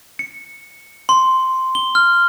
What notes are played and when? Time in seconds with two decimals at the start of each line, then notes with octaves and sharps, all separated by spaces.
0.19 C#7
1.09 C6
1.75 G7
1.95 F6